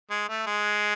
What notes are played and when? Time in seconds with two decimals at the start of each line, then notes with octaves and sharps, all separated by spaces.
0.10 G#3
0.29 A3
0.47 G#3